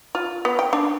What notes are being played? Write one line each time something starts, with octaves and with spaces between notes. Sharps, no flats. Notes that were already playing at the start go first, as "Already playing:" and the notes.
F4
B3
G5
D4